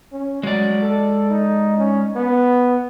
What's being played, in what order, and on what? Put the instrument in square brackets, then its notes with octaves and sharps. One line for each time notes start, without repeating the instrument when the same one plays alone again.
[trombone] C#4
[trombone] F#3 [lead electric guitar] G#3 D5
[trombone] A4
D#4
C#4
B3